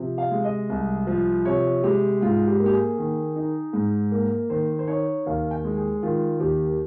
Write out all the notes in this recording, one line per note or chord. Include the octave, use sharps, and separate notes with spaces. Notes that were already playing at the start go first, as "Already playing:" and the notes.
Already playing: C3 F3
F5
G#3
D#5
C2
F3
C3 C#5
G#3 G4
G#2 F4
G4
A#3
G4
G#4
D#3
D#4
G#2
A#3
D#3 C5
C5
D#4 C#5
D#2 F5
G5
G#3
G#4
D#3 F4
D#2 G4